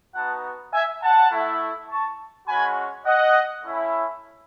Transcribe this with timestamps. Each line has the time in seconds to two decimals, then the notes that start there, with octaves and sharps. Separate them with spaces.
0.14 B3 D#4 F#4 F#5 A5
0.72 E5 G#5
1.01 F#5 A5
1.31 A3 E4
1.89 A5 C#6
2.47 G#3 C#4 F#4 G#5 B5
3.06 D#5 F#5
3.64 A3 C#4 E4